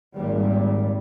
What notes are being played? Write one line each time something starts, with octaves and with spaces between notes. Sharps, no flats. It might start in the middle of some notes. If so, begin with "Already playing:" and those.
G#1 A#2 G3